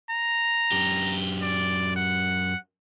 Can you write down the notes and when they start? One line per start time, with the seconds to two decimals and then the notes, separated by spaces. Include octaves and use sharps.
0.11 A#5
0.72 F#2 G4
1.42 D5
1.96 F#5